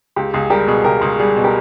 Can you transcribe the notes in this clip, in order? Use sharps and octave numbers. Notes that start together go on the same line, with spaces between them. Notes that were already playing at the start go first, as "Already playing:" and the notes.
C#2 G4
C#2 G#4
G3 G4 A#4
B2 G#4
C#2 G4 A#4
C#2 G#4
G3 G#4
B2
G4 A#4